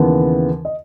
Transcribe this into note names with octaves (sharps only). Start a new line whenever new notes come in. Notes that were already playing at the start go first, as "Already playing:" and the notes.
Already playing: D#2 C#3 E3 B3
D#5